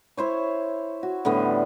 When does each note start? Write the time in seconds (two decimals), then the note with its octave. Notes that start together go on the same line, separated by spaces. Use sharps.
0.17 E4 C5 C#5
1.03 F#4
1.25 A2 D3 G3 B3